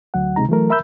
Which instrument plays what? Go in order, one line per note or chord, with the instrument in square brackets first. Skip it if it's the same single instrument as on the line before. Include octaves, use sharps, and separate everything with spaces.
[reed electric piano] D2 F#3 F#5
C#2 C3 G#3 D#4 A#5
E3 F#3 A3 A#4
A#4 E5 B5 E6 G6